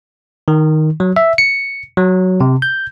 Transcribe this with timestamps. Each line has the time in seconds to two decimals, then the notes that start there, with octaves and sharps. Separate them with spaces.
0.48 D#3
1.00 F#3
1.16 E5
1.38 C#7
1.97 F#3
2.41 C3
2.62 G6